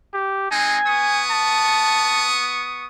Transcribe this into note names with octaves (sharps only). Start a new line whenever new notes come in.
G4
G#3 C4 D#4 G#5
B3 C#6 D#6
A5